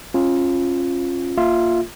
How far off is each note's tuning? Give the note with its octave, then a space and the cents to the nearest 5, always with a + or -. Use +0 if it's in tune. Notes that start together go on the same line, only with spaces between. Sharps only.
C#4 -30 F4 +0
A#3 +0 F4 +0 E5 +0